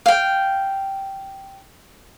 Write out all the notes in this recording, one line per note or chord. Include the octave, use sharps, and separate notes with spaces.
F5 G5